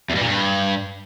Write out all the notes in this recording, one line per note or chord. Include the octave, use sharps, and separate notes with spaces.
E2
G2
A#2
G2